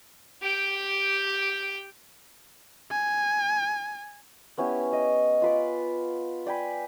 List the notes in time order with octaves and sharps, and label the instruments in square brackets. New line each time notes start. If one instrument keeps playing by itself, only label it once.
[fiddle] G4 G5
[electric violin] G#5
[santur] B3 C#4 E4 G4
D#5
F4 B4 D6
D5 G5 G#5 B5